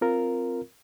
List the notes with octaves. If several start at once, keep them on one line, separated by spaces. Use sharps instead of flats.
C4 F4 A#4